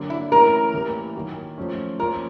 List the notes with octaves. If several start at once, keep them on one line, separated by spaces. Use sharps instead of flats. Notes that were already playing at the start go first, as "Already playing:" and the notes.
Already playing: D3 F#3 A#3
E4
E3 A3 C#4 E4 A#4
A2 E3 G3 A#3
D#3 F#3 A#3
F3 A3 C#4
F3 A#3 C#4 F4 A#4